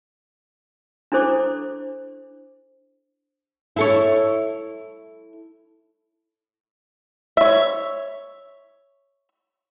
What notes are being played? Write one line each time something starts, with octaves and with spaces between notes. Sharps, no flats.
D4 E4 A4 C5 D6
E4 A4 C#5
C#5 E5